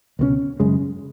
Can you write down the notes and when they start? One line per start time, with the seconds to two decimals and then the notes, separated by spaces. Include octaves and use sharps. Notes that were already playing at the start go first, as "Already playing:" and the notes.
0.19 C#2 B2 G#3 C#4
0.60 F#2 C#3 G#3